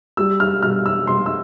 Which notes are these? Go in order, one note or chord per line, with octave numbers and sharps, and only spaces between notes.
G3 E6
F6
B2 F6
E6
B2 C6
E6